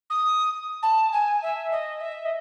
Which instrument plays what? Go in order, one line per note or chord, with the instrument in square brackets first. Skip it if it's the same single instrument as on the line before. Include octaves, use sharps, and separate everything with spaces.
[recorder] D#6
A5
G#5
E5
D#5
E5
D#5